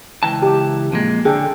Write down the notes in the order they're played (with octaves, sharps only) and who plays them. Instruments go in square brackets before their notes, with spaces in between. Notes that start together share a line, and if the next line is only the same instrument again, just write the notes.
[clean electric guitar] C#2 E3 A5 [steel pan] G5 A#5
[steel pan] G4 E5 D6
[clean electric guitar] F2 A#2 G#3
[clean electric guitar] D3 [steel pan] G#4 A4 G5